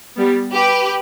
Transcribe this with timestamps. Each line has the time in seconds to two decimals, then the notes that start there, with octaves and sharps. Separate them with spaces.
0.16 G3 B3
0.54 G4 B4